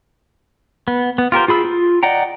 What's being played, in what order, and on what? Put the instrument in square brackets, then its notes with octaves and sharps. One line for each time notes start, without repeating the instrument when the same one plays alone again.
[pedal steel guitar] B3
B3
F4 G4 A#4 C5
F4 G#4 B5 E6
F4
D5 D#5 F#5 G5 A#5